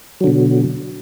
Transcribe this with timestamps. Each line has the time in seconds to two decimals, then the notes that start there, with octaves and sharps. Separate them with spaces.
0.21 F#3
0.24 D3
0.27 B2